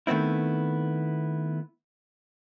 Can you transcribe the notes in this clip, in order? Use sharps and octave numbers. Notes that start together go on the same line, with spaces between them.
D#3 A3 B3 C4 E4